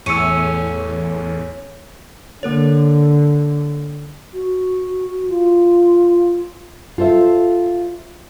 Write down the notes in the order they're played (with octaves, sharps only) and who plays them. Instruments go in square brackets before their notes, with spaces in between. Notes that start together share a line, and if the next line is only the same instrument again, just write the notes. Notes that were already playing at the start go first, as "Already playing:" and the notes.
[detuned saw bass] E2 [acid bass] A2 [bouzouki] C#4 [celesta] E6 C#7 D#7
[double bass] D3 [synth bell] A#3 A#4 C#5
[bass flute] F#4
F4
[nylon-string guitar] F4 A4 C5 E5